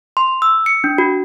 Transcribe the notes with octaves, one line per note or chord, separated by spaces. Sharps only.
C6
E6
C#7
D4
F#4